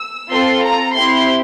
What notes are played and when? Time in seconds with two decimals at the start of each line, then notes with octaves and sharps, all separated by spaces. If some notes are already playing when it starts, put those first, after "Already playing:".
Already playing: E6
0.30 C4 F4 A4 C6
0.63 A#5
0.93 C4 E4 G4 C6